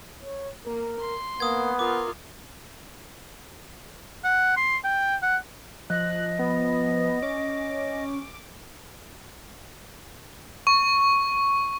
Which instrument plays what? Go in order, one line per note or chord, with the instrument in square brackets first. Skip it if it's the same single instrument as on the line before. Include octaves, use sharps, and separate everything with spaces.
[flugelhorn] C#5
[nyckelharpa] A#3 [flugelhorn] A#4
[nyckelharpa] C6
[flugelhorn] A#3 [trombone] B3 [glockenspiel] D#6 G#6
[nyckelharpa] F4 [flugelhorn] A#4 [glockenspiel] D6
[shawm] F#5
C6
G5
F#5
[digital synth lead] F3 [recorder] D#5 [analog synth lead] F#6
[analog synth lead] B3
[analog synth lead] C#4 [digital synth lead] D6
[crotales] C#6